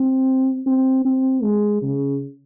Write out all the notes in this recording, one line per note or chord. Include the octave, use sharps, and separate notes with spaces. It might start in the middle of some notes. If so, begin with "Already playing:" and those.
Already playing: C4
C4
C4
G#3
C#3